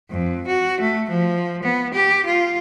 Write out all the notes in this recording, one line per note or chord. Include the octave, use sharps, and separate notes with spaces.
F2
F#4
A3
F3
B3
G4
F4